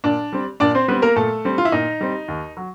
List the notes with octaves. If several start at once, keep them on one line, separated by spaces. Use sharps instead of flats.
A#2 D4 D5
G3 C4
A#2 D4 D5
C4 C5
G3 B3 C4 B4
A#3 A#4
A#2 A3 A4
G3 C4
F4
E4
A#2 D#4
G3 C4
D#2
F#3